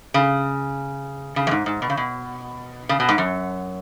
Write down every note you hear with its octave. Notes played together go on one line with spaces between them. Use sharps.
C#3
C#3
F#2
G#2
G#2
B2
C#3
B2
C#3
B2
G#2
F#2